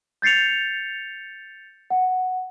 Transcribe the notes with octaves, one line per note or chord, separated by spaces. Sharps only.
G6 A6 C7 C#7 F7
F#5